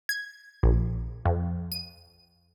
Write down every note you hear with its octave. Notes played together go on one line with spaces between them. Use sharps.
G#6
A#1
F2
D#7